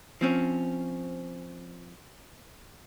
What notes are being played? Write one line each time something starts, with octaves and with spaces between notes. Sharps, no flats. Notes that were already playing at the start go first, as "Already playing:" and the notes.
F3 C4 C#4